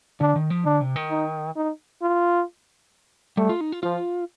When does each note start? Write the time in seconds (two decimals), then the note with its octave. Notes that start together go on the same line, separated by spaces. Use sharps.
0.21 D3 D4
0.36 D#3
0.50 F3
0.65 D3 D4
0.81 C3
0.96 D#3
1.11 D#4
1.56 D#4
2.02 F4
3.37 G3 A3
3.49 F4
3.61 D#4
3.72 F4
3.83 F3 F4